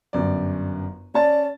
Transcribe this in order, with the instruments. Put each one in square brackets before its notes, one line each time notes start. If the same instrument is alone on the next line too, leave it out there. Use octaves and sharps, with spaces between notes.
[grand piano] G1 F#2 D5
[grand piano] C#4 A5 A6 [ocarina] D5